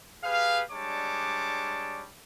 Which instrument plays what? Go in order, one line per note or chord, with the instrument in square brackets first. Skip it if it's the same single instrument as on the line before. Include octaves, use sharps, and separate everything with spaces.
[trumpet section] G4 G#4 B4 F5
G3 G#3 D4 C#5 A5 D6